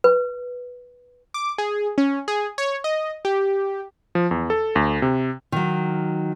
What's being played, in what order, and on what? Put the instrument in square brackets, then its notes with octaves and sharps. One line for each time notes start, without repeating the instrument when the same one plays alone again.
[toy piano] B4
[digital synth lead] D6
G#4
C#4
G#4
C#5
D#5
G4
[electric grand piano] F3
E2
A4
D2
C3
[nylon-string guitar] D#3 F#3